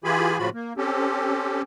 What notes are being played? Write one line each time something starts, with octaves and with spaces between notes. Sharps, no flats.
E3 F4 G4 G#4 G#5 B5
A2 C#3 F3 F4 F#4 B5
A#3
C4 C#4 G4 A4